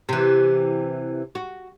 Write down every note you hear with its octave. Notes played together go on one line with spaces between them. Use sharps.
C3 E3
F#4